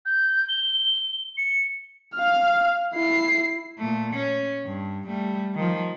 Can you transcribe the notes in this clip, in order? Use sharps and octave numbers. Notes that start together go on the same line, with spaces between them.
G6
G7
C#7
F5 F6
E4 C7
A#2 A3
C#4
G2
G3 A3
D#3 F3